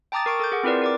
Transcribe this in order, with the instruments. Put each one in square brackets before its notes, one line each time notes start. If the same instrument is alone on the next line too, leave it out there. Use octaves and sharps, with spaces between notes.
[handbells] G5 A5 A#5 D6 D#6 A6
A#4 C#6 D7
A4 D6 G6
G#4 F#5
C4 E4 F4 A#4 B4 D5
A#4 D5 D6